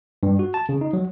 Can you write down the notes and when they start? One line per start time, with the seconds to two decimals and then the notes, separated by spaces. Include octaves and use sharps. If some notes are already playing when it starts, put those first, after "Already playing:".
0.23 G2
0.39 F#4
0.54 A5
0.69 C#3
0.81 D#4
0.93 F#3